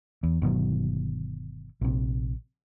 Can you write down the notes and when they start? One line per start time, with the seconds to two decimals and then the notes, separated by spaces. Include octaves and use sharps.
0.23 E2
0.42 G1 B2 D#3 F#3
1.81 A#1 C3